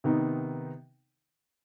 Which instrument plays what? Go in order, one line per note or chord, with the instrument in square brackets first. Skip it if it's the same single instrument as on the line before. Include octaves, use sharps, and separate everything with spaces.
[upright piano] C3 D#3 B3 D#4